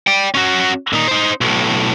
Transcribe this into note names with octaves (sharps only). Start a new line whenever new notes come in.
D5 G5
C#4 F#4
A#2 D#4
D#4 C5
B1 A2